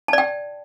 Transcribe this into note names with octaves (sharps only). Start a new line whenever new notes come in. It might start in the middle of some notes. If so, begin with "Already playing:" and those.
D5 G5 A5